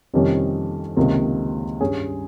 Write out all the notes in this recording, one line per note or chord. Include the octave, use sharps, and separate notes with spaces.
F2 C3 D#3 G3 C#4
C#2 C3 D#3 A#3
G2 G3 C#4 G#4